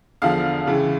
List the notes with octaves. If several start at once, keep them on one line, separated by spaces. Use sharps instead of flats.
E2 D3 F3 F5
C#2 C#3 E3